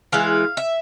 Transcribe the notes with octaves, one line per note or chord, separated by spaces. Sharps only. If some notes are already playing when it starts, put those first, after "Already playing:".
E3 G#3 E4 F5
E5